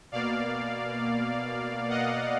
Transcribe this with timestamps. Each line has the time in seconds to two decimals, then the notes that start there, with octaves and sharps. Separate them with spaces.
0.12 B2 A#3 D5 F5
1.89 D#5 F#5